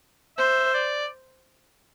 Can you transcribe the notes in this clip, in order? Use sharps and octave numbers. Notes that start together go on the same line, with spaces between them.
C5 E5
D5